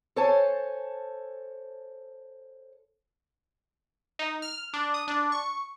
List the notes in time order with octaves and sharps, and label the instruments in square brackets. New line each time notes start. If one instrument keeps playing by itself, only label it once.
[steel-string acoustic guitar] A4 C5 C#5 G#5 A5
[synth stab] D#4
F6
D4
D#6
D4
C#6